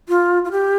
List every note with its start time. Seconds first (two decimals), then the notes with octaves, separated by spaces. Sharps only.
0.09 F4
0.45 F4
0.51 G4